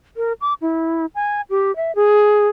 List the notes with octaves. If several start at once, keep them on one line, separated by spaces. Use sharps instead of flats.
A#4
D6
E4
G#5
G4
E5
G#4